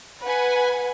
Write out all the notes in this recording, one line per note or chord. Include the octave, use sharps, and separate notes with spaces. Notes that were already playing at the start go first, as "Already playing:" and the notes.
B4 F#5 G#5